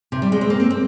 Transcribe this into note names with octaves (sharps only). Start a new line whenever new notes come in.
C3
G3
G#3
C4
A#3
C4
C4